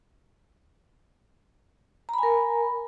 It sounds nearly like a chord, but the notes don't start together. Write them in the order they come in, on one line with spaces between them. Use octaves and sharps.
A#5 B5 G#5 A#4